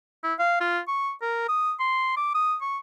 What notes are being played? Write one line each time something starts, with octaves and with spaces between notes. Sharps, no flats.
E4
F5
F4
C#6
A#4
D#6
C6
D6
D#6
C#6